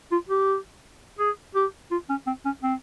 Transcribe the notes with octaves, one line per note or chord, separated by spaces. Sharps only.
F4
G4
G#4
G4
F4
C#4
C4
C#4
C4